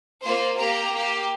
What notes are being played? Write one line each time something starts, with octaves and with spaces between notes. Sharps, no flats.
A#3 F4 C5
A#3 G4 A#5
A#3 G4